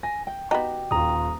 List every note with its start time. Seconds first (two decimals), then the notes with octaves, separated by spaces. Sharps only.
0.03 G#5 A#6
0.27 G5
0.51 B3 D#4 F#4 G4 G5
0.91 D#1 F4 A#5 D#6